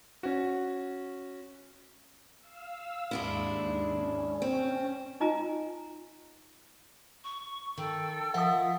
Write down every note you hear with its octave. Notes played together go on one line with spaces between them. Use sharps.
C#4 F#4
F5 E6
D#2 G#2 G#3 D4 E4
C#4
C4
D#4 F4 D#5 G#5 A#5
C#6
D#3 A4 G5 E6
F3 F4 A#4 E5 F#5 D#6